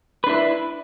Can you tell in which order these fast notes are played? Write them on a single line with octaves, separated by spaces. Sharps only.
B4 D4 E4